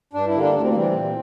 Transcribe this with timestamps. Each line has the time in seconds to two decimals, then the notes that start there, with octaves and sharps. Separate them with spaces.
0.13 G2 D4
0.27 E4
0.35 D3 G3 A#3
0.42 D4
0.54 D2 D4
0.62 C4
0.69 A#3
0.74 C3 E3 G3 C4
0.94 A#2